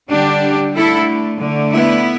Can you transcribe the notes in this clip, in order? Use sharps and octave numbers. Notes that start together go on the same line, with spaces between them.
D3 G3 D4 G4
D3 A3 E4 A4
D3 A3
B3 E4